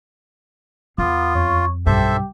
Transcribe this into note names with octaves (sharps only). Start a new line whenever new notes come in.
E2 B3 F4 D6 D#6
F2 C#5
B1 G2 G4 A4 C5 E5